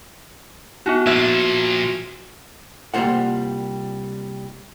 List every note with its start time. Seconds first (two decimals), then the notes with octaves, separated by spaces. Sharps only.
0.86 B3 D#4 E4 F#4
1.07 A#2 F3 E5 G#6
2.94 C2 G3 A#3 F4 C5 F#5